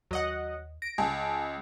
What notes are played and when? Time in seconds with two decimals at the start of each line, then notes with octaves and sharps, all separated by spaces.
0.11 D#2 F#3 D#5 F#5
0.82 A#6 D7
0.98 C#2 G#5 A5